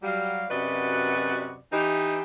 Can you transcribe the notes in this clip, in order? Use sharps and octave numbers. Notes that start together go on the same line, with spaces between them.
F#3 G3 F5
F#2 C3 F#4 B4 D5 D#5
E3 D#4 G4